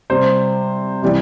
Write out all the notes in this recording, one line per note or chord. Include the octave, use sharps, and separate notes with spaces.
C3 G3 C5
C3 E3 G3